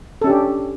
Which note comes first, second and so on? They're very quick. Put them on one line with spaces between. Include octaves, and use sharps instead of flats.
A4 C#4 G4 D4